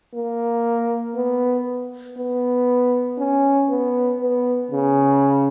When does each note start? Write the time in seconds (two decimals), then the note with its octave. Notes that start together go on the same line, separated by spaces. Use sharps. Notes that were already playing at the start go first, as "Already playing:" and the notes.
0.14 A#3
1.15 B3
2.17 B3
3.18 C#4
3.69 B3
4.20 B3
4.71 C#3